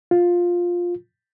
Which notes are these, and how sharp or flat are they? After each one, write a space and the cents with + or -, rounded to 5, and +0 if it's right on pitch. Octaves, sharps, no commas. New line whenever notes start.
F4 +10